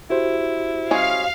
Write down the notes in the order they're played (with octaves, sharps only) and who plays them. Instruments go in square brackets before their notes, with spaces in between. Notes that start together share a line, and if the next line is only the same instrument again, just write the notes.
[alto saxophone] E4 [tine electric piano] F#4 G4 C5
[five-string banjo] G#3 C#4 [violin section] F5